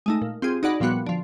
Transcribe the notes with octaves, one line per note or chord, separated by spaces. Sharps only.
G#3 A3 D#4
A#2
C4 F4 G4 G#4
D#4 F#4 G#4 D5 F#5 B5
A#2 F3 G3 B3 F#4
D3 F3